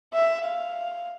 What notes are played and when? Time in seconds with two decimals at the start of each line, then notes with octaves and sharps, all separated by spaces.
0.13 E5
0.45 F5